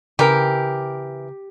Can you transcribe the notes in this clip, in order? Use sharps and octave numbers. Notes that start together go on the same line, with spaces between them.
C#3 E3 G4 A#4